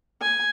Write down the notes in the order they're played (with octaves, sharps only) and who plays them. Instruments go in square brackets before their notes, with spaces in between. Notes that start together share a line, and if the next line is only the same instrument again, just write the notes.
[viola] G#5